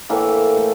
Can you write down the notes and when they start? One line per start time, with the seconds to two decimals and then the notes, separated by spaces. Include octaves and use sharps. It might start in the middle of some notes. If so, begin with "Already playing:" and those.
0.10 A2 E3 A3 A#3
0.57 A3